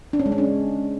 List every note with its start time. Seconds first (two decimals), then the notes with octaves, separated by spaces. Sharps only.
0.13 D4
0.19 C#4
0.26 G#3
0.32 C#4
0.38 D4